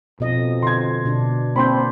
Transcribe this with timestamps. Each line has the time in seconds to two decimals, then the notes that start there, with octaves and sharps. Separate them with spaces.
0.20 F2 B2 D#5
0.62 D3 C6 G#6
1.05 B2 D4
1.56 A#3 C4 D4 B5 C6 G6